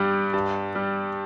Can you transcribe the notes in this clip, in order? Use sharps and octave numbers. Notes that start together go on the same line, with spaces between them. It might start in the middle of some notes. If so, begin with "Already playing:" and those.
Already playing: G2 G3
G2
G3